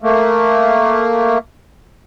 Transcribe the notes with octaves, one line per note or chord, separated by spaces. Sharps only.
A3 A#3